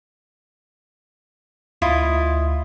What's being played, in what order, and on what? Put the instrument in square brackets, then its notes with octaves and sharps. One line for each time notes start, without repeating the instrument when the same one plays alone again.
[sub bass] D2 [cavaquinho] E4 F4 D#5